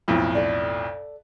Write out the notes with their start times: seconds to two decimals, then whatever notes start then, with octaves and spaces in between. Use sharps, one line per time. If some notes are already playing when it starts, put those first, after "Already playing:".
0.08 B1 F2 A2
0.35 A4 D5